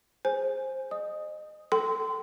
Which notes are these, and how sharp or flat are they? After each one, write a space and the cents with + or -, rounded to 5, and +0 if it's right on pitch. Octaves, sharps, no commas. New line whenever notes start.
G#4 +0 C5 +15 G#5 +0
D#5 -30 D#6 +5
A4 +0 G5 -30 C6 -25